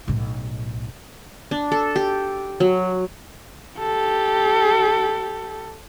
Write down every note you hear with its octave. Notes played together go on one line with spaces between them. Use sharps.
B1 A2
D4
A4
G4
F#3
G4 A4